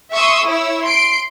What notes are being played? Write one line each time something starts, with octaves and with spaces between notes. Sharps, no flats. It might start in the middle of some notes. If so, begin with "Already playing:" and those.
E5 C6 C#6 D#6 E6
E4 C#5 E6
C6 C7 D7